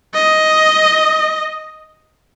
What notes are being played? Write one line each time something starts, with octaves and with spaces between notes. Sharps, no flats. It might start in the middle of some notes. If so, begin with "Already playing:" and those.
D#5